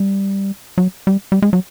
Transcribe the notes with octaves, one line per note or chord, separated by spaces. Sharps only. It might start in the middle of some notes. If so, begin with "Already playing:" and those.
Already playing: G3
F#3
G3
G3
G#3
F#3